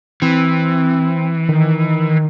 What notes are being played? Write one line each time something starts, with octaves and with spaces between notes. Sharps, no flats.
E3 C4
D#3